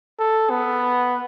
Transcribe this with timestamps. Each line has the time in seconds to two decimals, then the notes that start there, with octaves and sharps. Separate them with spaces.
0.19 A4
0.50 B3